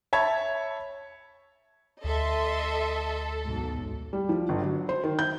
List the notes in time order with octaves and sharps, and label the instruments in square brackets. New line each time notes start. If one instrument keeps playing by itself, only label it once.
[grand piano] C#5 E5 A5 B5 G#6
[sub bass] D2 [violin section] A4 [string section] D#5 E5 C6
[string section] B1 G#2
[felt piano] G3
F3
G1
F#3
C5
D#3
G6